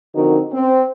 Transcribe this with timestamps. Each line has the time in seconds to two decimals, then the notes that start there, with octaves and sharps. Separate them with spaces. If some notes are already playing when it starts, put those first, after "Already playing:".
0.15 D3 F3 C4 D#4 F#4 A#4
0.52 C4